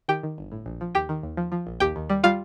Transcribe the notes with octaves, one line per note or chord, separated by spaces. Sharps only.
D#3 G4 G5
D#3
G1
A2
A#1
F3
D#2 G4 G5
D#3
D#2
F3
F3
A#1
D#2 G4 G5
D#2
G3
G3 F4 F5